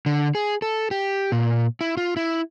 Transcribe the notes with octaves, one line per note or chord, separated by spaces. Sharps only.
D3
G#4
A4
G4
A#2
E4
F4
E4